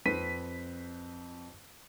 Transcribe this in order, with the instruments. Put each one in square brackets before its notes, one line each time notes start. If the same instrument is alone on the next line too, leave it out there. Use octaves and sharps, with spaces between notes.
[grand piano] F2 [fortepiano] C4 B4 C5 [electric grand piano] B6 D#7